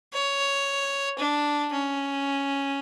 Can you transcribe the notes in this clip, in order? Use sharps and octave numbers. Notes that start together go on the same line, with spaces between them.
C#5
D4
C#4